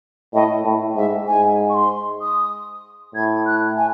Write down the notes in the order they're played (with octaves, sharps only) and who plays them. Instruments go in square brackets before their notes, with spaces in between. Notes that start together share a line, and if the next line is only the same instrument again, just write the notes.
[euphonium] A2 [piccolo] D#5
[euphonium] A2
[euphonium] G#2 [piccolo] E5
[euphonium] G#2 [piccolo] G#5
[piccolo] C#6
C6
D#6
[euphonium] A2 [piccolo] G#6
[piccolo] F#6
G#5